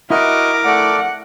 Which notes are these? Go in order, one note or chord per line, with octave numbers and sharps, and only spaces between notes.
E4 F#4 A#4 D#5 D6
A3 D5 F#5